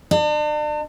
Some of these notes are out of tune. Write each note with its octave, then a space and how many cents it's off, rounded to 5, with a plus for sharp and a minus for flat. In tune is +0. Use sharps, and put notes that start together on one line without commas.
D4 +40